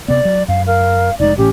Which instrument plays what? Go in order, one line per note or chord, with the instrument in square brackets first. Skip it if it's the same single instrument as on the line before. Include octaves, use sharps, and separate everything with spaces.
[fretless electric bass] C3 B3 [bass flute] D5
[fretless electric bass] F#3
[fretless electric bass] F#2 [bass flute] F5
[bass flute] A#4 [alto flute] F5
[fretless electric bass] F1 G#3 [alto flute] D#4 [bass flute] D5
[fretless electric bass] A1 A2 E3 [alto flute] C#4 [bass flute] G4